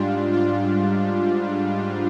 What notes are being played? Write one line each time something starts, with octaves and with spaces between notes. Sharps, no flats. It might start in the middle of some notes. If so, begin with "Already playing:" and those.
Already playing: G#2 G3 D4 F4
F4